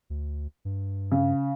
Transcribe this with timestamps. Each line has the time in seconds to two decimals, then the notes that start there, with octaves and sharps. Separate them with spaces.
0.10 D2
0.65 G2
1.11 C#3